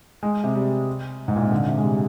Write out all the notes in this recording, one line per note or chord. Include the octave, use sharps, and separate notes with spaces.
G#3
C3
G3
G#2
A#2
C3
D3
C3
G#3
G3